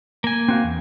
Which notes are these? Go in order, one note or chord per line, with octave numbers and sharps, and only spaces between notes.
A#3 G#5
C4 F#4 F5
E2